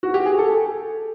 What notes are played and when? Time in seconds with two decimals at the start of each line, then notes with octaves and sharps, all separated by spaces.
0.03 F#4
0.14 G4
0.26 G#4
0.39 A4